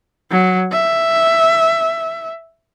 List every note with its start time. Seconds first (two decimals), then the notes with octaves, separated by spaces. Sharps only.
0.31 F#3
0.72 E5